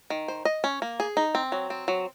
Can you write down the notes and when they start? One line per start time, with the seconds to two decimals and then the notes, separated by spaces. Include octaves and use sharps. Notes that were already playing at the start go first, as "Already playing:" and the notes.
0.10 D#3
0.28 C5
0.45 D#5
0.64 C#4
0.82 A#3
1.00 G#4
1.17 D#4
1.35 C4
1.52 F#3
1.70 C4
1.88 F#3